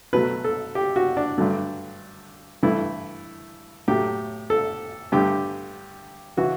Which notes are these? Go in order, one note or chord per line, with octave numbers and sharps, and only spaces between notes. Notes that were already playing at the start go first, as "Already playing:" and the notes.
B2 F#3 A3 B4
A4
G4
F#4
D4
G2 D3 F#3 A3
G2 E3 A3 E4
A2 F#3 A3 G4
A4
G2 D3 A3 G4
C#3 E3 F#4